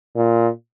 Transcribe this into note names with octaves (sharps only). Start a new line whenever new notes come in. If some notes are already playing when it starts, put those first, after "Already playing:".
A#2